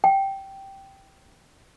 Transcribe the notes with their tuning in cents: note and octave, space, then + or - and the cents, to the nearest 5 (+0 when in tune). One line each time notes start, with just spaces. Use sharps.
G5 -10